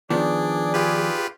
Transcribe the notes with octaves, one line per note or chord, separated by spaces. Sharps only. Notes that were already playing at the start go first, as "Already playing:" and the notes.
D#3 F3 B3 D4 G#4 D5
F4 G4 B4